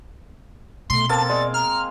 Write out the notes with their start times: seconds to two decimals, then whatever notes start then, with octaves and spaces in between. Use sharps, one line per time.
0.90 B2 A3 C6
1.09 A#3 C4 A4 A5 A6
1.29 G#3 D5
1.54 A#5 F6